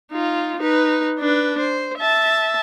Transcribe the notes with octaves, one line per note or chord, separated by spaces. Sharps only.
D#4 F4
D#4 B4
D4 B4
C5
E5 A5